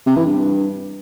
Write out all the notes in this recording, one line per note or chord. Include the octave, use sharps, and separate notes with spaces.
C3
E3
G2